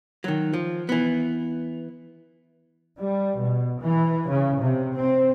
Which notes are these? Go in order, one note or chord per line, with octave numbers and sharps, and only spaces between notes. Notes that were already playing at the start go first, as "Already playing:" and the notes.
D#3 F#3
F3
E3 B3
G3
B2
E3
C#3
C3
C4